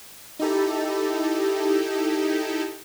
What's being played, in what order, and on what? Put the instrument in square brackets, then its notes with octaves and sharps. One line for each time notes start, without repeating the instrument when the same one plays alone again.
[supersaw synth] D#4 E4 G4 A4